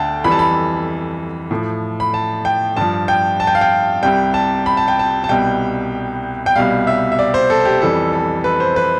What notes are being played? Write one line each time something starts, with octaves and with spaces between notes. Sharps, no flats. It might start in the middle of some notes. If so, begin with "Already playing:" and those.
Already playing: D2 D3 G5 A5
F2 E3 G3 B5
A5
B5
A2 F3
B5
A5
G5
G2 F3 A5
G5
A5
G5
F5
G5
C2 C3 G3 G5
A5
B5
A5
G5
A5
A5
C2 B2 G3 G5
G5
C2 B2 G3 F5
E5
E5
D5
C5
A4
G4
F2 E3 G3 A4
A4
B4
C5
B4